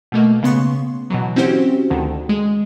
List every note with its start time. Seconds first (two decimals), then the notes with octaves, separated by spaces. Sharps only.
0.12 B2 A3 A#3
0.43 C#3 B3 C6 C#6
1.10 B2 E3 F#3
1.36 C4 C#4 E4 F#4 G4 C5
1.91 D2 D3 D#3
2.29 G#3